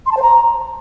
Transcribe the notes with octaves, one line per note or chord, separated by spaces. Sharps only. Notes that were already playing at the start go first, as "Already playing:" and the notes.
C6
A5
C5
A#5